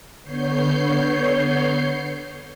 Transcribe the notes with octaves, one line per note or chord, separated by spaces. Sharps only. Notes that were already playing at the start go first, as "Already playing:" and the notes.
D3 B3 C#5 G6 C7